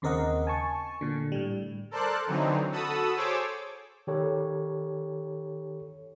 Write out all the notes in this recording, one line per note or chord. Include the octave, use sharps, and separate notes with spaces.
D#2 C#3 C4 A#4 D#5 F#5
G#5 A5 C#6
A#2 D3
A2 G3
A4 A#4 C5 D5 A5 F#6
D3 E3 F#3 C4 D#4
F#4 A4 A5 B5 D#6 E6
G#4 A4 C5 C#5 D6 E6
D#3 G4 A4 C#5